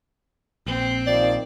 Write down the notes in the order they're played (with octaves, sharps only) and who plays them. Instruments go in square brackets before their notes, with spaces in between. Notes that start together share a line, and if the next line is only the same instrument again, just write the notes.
[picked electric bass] A#1 [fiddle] C4
[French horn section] D#3 F3 [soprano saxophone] D5